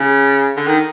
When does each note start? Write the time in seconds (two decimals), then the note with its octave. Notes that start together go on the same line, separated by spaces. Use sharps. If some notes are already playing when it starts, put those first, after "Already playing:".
Already playing: C#3
0.56 D3
0.67 D#3